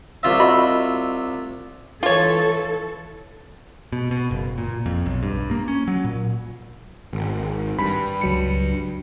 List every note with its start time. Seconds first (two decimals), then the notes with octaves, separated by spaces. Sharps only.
0.23 C2 F4 E5
0.40 F#4 D#5 B5
2.03 E3 F4 A4 C#5
3.92 B2
4.11 B2
4.31 F#1
4.58 A#2
4.86 F2
5.06 B1
5.23 G2
5.51 A#3
5.68 C#4
5.88 F#3
6.05 A#2
7.13 G#1
7.79 G2 B5
8.21 C#2 F#3 C#7